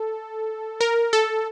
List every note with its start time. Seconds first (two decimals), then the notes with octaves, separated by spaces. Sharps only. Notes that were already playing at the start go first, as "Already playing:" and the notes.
Already playing: A4
0.81 A#4
1.13 A4